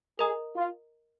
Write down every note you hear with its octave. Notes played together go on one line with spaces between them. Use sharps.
G#4 A#4 D#5 A#5 D#6
F4